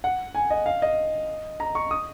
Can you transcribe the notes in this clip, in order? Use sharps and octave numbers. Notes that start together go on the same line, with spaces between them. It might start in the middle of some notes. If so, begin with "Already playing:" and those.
F#5
G#5
D#5
F5
D#5
A#5
C#6
D#6